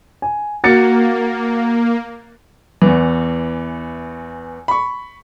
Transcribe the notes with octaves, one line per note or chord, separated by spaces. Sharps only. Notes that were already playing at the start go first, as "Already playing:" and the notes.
G#5
A#3 F#4 A6 C#7
E2 E3
B5 C#6